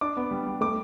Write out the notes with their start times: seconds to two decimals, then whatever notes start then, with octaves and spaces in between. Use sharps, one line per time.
0.01 D4 D6
0.17 B3
0.31 G3
0.46 G3
0.61 A3 D6